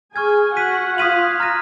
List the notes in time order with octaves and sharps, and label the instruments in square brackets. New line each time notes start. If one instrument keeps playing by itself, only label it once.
[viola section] G#4 G#5 [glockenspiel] C#6 F6 G#6
[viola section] F#4 F#5 [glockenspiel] F#6 B6 D#7
[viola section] F4 F5 [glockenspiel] D#6 G#6 B6 D#7 F#7
[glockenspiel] A#5 F6 A#6 D#7